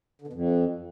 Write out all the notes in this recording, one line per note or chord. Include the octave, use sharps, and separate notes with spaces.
D3
B2
F2